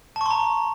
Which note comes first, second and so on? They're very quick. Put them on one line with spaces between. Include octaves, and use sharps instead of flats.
A5 C#6 C6 A#5